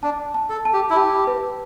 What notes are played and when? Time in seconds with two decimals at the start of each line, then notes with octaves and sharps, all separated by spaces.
0.03 D4 A5
0.34 A5
0.50 A4
0.65 A5
0.73 G4
0.90 E4
0.96 G4 A5
1.27 B4